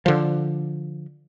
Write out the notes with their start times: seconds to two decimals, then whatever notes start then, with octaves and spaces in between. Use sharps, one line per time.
0.06 D3 F3